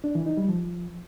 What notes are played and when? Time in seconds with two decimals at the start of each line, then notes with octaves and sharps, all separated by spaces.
0.04 D4
0.15 E3
0.26 D#4
0.37 G3
0.49 F3